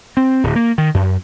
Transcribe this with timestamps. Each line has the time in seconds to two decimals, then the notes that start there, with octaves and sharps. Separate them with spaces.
0.17 C4
0.44 D1
0.55 A#3
0.78 D#3
0.94 F#2